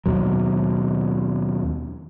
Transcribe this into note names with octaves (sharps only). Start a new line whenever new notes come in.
D#2 B2 F#3